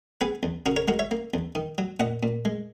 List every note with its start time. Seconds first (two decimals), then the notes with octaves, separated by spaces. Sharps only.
0.21 B3 G#4 B4
0.43 E2
0.66 C#3 F#4 A#4
0.76 A#4 C#5
0.88 G#3 F#4 A#4
0.99 C#5 E5
1.11 A#3
1.34 E2
1.55 D#3
1.78 F#3
2.00 A#2 D#5 F#5
2.23 A#2
2.45 G#3